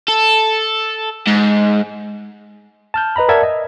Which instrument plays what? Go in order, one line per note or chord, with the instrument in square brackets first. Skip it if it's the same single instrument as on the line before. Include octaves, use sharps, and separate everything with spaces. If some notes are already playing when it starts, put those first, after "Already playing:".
[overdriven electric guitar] A4
G#2
[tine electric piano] A5 F6 G6
B4 D#5 A#5 B5
A#4 D5 E5 F#5 A5 G#6
D#5